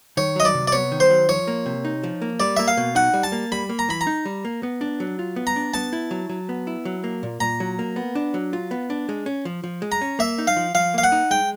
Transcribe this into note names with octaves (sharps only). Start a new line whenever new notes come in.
D#3 C#5
F#3 D#5
D5
C3
D5
B3 C#5
D#3
C5
F#3
F3 C#5
A#3
C3
D#4
F3
A#3
G3 D5
A#3 E5
F5
B2
D#4 F#5
G3
A5
A#3
G3 B5
A#3
A#5
E3 B5
A#5
D#4
G3
A#3
B3
D4
F#3
F4
B3
A#5
D4
B3 A5
E4
F#3
F#3
B3
E4
F#3
A#3
A#2
A#2 A#5
F#3
A#3
B3
D4
F#3
F4
B3
D4
G#3
C#4
F3
F3
G#3
A#5
C#4
A#3 E5
D#4
F5
F3
F3 F5
A#3 F5
F#5
D#4
G#3 G5